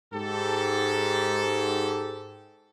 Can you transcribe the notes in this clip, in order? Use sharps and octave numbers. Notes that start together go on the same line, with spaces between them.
G#2 G4 A4